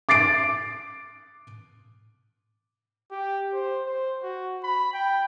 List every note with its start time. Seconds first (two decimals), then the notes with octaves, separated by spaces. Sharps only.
0.09 D6 A6 C7 D7
3.11 G4
3.53 C5
3.86 C5
4.23 F#4
4.63 B5
4.93 G5